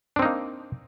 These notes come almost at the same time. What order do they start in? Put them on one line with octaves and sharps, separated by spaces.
D4 C4 D#4 A#3